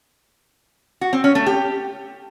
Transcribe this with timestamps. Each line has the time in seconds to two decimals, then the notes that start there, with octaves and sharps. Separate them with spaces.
1.01 F#4
1.13 C4
1.24 C#4
1.35 A3
1.46 G4